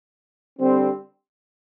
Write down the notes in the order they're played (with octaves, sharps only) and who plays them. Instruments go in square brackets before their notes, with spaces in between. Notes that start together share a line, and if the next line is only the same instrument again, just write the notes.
[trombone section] D3 G3 C4